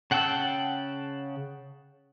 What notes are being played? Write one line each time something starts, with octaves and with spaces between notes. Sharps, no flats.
C#3 F#5 G5 A5 E6